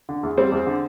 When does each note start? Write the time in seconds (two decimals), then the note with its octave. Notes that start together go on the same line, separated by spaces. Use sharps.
0.09 D3
0.23 E2
0.38 G3 C4 C5
0.52 E2
0.67 D3